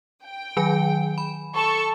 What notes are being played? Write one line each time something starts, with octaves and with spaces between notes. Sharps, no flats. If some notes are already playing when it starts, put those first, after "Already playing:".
G5
D#3 F#3 G#5
B5
A4 C#6